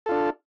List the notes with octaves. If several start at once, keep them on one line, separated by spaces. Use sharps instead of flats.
D4 F4 A4